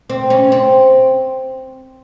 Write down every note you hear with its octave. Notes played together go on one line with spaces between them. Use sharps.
C4
C#4
C4